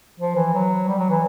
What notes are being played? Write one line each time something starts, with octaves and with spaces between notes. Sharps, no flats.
F3
E3
F#3
G3
F#3
E3